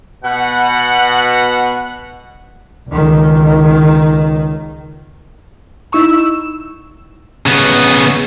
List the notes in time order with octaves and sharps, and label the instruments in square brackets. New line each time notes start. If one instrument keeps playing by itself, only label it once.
[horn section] B2 F#5
[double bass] C#2 D#3
[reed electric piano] D#4 E4 C#6 [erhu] E6
[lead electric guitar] C#3 B3